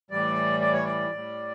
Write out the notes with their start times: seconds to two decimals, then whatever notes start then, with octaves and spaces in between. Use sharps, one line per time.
0.11 A2 E3 G3 D5
0.61 D5
0.73 C#5
0.84 D5
1.10 A2 G3